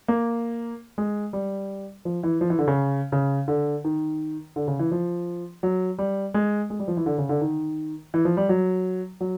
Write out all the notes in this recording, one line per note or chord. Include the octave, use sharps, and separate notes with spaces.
A#3
G#3
G3
F3
E3
F3
E3
D3
C#3
C#3
D3
D#3
D3
C#3
E3
F3
F#3
G3
G#3
G#3
G3
F3
E3
D3
C#3
D3
D#3
E3
F3
G3
F#3
F#3